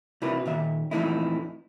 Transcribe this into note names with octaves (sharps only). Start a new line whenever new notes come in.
C3 E4 F#4 A#4 B4
A#2 D#3 E5
F2 A#2 E3 A3 D#4 E4